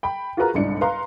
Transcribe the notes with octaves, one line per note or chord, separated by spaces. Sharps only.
G5 B5
F4 F#4 G#4 A#4 B4 A#5
G1 C2 G#2 D4 C#7
B4 F5 A#5 C6